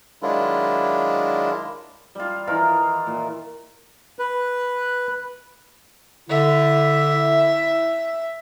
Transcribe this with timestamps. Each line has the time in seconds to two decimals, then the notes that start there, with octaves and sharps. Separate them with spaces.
0.23 D#3 F#3 G#3 D4 E4 F4
2.15 G3 F4
2.47 D#3 E3 F4 A#4
3.07 A#2
4.19 B4
6.30 D3 E4 E5